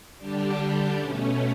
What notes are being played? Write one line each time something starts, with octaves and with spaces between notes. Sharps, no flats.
D3 G3 D4 G4
B2 A3 C#4